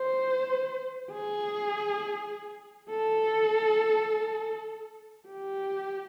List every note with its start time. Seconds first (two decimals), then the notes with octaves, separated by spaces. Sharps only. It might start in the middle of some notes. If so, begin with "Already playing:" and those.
Already playing: C5
1.12 G#4
2.91 A4
5.29 G4